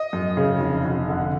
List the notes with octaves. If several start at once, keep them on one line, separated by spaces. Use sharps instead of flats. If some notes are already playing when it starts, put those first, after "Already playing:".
Already playing: D#5
F#2
C#3
F1
F1
D3